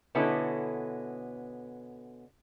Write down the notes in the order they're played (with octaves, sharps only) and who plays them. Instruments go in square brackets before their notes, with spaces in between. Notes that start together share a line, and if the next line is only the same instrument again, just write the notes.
[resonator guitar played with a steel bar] B2 D3 B3 C#4 E4 A4